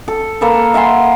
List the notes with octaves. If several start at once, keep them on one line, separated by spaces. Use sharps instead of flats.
A4
A#3 A4 B4
E5 F#5 G#5 C6